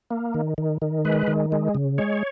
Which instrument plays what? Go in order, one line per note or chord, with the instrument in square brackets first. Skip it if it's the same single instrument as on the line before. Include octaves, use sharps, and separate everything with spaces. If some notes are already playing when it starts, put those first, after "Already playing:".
[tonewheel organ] A#3
D#3
D#3
D#3
G#3 B4
D#3
G#3
C#3
G#3 C#5